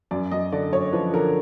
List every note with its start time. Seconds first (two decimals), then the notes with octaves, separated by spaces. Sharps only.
0.11 F#2 D5
0.31 F#2 D#5
0.52 D3 D5
0.73 F#2 C#5
0.93 F3 B4
1.13 D3 A#4